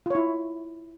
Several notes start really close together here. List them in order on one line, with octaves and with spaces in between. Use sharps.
F4 C#5 E4